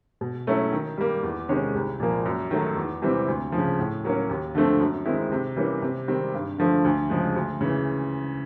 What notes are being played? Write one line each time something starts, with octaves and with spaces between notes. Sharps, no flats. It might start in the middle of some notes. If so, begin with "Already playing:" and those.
B2
F#3 A3 C#4 E4
D#3
G3 A#3
E2
C3 D#3 G#3 C#4
C2
A#2 F3 A#3
F#2
D#3 F#3 A3
E2
C3 E3 G3 C4
D2
F3
C#3
A2
F#3 A#3 C#4
D#2
D3 F3 A3 C4
F#2
D#3 G#3 C4 E4
C3
E3 G3 A#3 C#4
C3
D#3 G3 C4
G2
D3 F3 A3
D2
C#3 F3 G#3
D2
C#3 E3